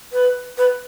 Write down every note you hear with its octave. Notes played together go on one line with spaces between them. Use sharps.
B4
B4